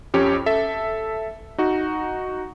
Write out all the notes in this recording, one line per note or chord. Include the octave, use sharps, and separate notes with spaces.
F2 C#4 G4 C#5
A4 E5
D#4 F#4